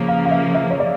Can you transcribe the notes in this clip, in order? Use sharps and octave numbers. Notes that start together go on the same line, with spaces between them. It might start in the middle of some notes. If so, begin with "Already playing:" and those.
Already playing: C#3 F3 A#3
F5
F5
E5
E5
C#5
D5